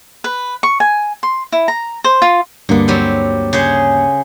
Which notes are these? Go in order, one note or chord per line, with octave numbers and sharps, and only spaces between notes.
B4
C#6
G#5
C6
E4
A#5
C5
F4
D2 G2 D3 A#3 B3
F#3 G3 C4
C#3 G#4 C5